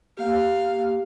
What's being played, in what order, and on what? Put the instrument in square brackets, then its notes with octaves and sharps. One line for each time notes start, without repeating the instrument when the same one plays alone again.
[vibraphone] A#3 G4 [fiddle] F5